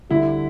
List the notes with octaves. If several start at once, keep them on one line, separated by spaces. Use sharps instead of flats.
D2 D3 G3 E4